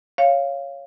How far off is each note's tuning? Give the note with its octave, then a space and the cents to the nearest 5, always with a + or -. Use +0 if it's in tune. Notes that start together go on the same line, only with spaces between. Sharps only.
C#5 +0 F5 -5